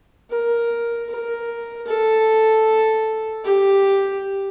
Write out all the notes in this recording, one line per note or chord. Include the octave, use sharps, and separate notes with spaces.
A#4
A#4
A4
G4